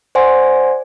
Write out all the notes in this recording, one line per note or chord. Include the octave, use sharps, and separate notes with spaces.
C5 D5 F#5 G#5 C6